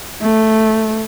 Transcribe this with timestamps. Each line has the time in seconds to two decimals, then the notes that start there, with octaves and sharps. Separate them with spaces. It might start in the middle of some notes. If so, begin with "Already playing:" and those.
0.21 A3